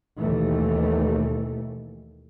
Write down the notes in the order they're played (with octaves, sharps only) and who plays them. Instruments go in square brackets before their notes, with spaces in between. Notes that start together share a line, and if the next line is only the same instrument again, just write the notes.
[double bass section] D#2 B2 E3 A3